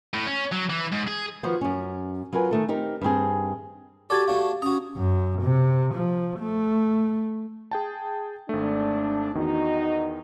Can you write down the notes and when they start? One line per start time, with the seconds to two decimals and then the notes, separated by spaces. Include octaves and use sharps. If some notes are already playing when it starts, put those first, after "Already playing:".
0.14 A2
0.27 C#4
0.52 F#3
0.70 E3
0.92 G#2
1.08 G#4
1.43 D#3 F3 B3 D#4 F#4 C5
1.61 F#2 C#4
2.33 F#3 F4 A#4 B4 G#5
2.51 D#3 A3 A4
2.68 C4 D#4 G4 A#4
3.01 G2 D#3 C4 G#4
4.10 F#4 G4 A4 D5 D6 G#6 A6
4.28 A3 D4 F#4 F5
4.62 C#4 F#4 A#5 D#6
4.96 F#2
5.42 C3
5.94 F3
6.39 A3
7.71 G#4 G5 A5
8.49 G#1 A3 D4
9.35 E2 D#3 D#4 F#4